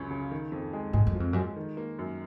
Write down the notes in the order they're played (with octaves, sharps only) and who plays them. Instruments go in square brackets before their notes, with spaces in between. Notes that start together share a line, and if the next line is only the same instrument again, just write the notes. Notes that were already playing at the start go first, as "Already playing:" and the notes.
Already playing: [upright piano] C#2 F#2 C#4
C#3
D#3
F2
G#3
[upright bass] G#2 [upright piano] G#3
[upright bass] F#2
[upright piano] F3
[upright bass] F2
[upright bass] F#2 [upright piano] G#3
[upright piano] D#3
A#3
F#2